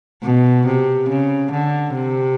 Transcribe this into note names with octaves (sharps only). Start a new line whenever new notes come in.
B2
C3
C#3
D3
C3